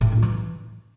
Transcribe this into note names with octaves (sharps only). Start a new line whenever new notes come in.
A2
D4
E3